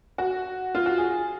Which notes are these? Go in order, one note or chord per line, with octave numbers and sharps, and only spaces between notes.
F#4
F4
F#4
G#4